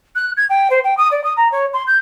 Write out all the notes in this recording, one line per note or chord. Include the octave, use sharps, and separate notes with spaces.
F#6
G#6
G5
C5
G5
D#6
D5
D#6
A#5
C#5
C6
G6